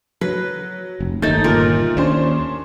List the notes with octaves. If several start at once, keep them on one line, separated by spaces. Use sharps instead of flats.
F#3 B4
F1
G1 D#2 A3 D#4 G6 A6
A#2 A#4
D#2 C#4 D4 C5